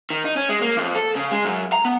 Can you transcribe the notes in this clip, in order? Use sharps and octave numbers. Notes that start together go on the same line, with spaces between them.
D#3
D#4
C#4
G#3
A#3
F2
A4
C#3
G#3
F#2
A#5
B3